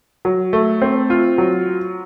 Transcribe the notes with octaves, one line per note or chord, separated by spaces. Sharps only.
F#3
A3
C4
F4
F#3